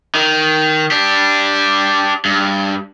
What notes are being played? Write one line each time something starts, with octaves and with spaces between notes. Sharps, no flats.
D#3
D4 G4
G2